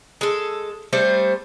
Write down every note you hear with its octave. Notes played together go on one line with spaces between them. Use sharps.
G#3 A4
G3 A3 C4 C5